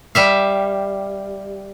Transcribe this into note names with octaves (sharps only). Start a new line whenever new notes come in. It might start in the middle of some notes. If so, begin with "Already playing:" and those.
G3 E5 F5